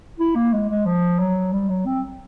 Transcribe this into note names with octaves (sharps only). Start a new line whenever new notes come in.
E4
A#3
G#3
G#3
F3
F#3
G3
F#3
C4